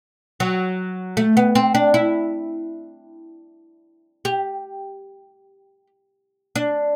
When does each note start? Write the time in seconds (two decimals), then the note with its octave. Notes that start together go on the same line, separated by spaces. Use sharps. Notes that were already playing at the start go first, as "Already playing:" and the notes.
0.40 F#3
1.17 A3
1.37 B3
1.55 C4
1.75 D4
1.94 E4
4.25 G4
6.56 D4